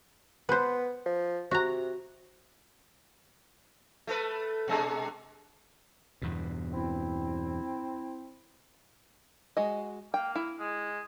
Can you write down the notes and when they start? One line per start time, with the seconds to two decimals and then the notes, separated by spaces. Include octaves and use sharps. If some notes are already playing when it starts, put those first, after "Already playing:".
0.49 B3 B4 C5
1.06 F3
1.51 C3 F#4 A#5
4.07 A3 A4 B4
4.68 B2 G#3 D4
6.22 E2 G2 B2
6.73 C4 E4
9.57 G#3 F#4 D#5
10.14 A#3 G5
10.35 E4
10.59 G#3